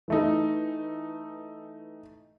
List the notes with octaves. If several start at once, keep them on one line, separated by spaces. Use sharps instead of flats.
E3 A3 D#4